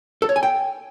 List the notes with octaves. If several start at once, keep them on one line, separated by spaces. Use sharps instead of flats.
A4
C#5
G#5
G5